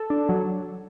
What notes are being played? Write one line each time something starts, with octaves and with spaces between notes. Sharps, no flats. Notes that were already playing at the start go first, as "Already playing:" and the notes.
Already playing: A4
D4
F#3